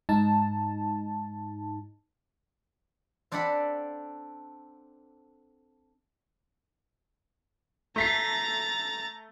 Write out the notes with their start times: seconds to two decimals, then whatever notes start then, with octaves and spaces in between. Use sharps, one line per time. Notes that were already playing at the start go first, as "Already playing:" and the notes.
0.09 G#2 D#4 A5
3.32 C4 D4 A4 D5 F#5 B5
7.96 A3 A#5 A6 B6 C7